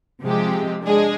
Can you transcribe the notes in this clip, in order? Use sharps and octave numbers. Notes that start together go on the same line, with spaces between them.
C3 F3 G#3 C4 G4
G#3 D4 G#4